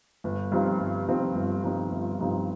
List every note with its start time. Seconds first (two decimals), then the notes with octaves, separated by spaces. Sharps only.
0.24 G1
0.52 G2 F3 C4 D#4
0.80 G1
1.07 G2 F3 C4 D#4
1.35 G1
1.64 G2 F3 C4 D#4
1.92 G1
2.20 G2 F3 C4 D#4